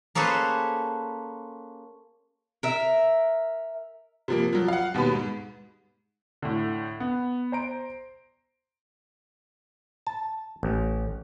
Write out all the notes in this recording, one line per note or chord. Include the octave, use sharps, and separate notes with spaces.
A#3 C#4 G#4 A4 B4 C5
A#4 E5
C3 F3 A#3
F3 F#3
F5 F#5
D#2 B2 B4 B5
G#2
A2 D3
B3
C5 A#5 D7
A5
A1